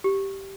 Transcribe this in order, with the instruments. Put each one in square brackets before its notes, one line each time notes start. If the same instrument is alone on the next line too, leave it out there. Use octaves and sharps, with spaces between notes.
[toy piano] G4